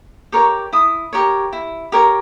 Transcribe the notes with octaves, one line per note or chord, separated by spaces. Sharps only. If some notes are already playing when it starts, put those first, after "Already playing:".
G4 A#4 C#5 C#6
E4 D#6
G4 A#4 C#5
E4
G4 A#4 C#5